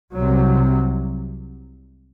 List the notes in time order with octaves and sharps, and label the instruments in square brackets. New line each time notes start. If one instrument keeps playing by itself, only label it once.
[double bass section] C2 C3 F#3